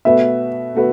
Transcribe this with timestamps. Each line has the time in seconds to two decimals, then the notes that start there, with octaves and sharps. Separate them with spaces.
0.05 B2 A3 F#4 B4 E5
0.74 B2 A3 F#4 B4